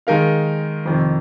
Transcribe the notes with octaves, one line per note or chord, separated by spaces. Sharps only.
D#3 G#3 D#4 A#4 F5
F2 C3 D#3